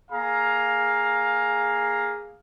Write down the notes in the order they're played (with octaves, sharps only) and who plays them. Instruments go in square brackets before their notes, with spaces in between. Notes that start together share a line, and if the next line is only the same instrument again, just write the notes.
[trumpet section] A#3 G#4 F5 A#5